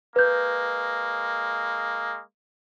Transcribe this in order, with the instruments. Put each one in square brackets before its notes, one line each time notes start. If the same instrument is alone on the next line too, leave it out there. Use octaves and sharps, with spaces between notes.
[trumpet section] G#3 A#3 [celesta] B4 G6